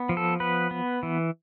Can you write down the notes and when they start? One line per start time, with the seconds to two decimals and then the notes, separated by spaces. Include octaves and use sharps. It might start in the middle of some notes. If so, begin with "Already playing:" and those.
Already playing: B3
0.09 F3
0.17 A4
0.40 B3 B4
0.71 B3
1.03 E3